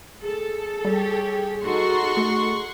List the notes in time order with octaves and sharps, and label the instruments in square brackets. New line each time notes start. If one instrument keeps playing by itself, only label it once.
[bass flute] G#4 [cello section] A4
[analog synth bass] G3 [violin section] G4 C#5
[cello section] D#4 F#4 A4 [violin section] F#5 C6 C#6
[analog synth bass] A3